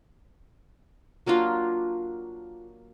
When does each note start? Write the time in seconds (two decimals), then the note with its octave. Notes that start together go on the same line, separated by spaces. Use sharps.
1.26 F#3 A#3 D4 F4